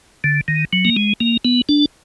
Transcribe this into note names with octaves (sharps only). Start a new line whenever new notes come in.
D3
D#3
F#3
A#3
G#3
A#3
B3
D4